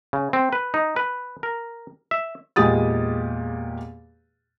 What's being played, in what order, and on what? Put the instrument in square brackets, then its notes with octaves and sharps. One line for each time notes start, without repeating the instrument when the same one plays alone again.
[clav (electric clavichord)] C#3
C4
B4
D#4
B4
A#4
E5
[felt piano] E2 A#2 G#3 G4 D#6 A6